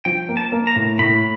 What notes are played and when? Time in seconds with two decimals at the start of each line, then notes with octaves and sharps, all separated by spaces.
0.05 F3 G5
0.29 A#3
0.37 A5
0.52 A#3
0.67 A#5
0.76 A2
0.99 A2 B5